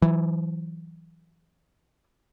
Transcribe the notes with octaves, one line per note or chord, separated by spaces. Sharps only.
E3 F#3